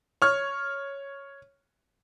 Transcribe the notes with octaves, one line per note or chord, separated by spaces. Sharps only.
C#5 F6